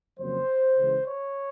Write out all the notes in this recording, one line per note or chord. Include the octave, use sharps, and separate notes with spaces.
F2 C#3 F#3 A#3 C5
C#2 C#3 E3
C#5